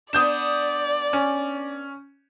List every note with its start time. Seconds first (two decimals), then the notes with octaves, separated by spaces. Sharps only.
0.13 B3 D4 D5 D#6 G6 E7
1.13 C#4